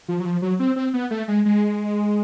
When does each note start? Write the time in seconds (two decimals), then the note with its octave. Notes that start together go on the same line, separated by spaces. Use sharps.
0.08 F3
0.20 F#3
0.25 F3
0.42 F#3
0.60 C4
0.76 C4
0.94 B3
1.11 A3
1.28 G#3
1.46 G#3